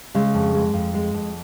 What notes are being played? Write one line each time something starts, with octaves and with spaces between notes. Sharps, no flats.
C#3 G#3
F2
G#3
F2
G#3
F2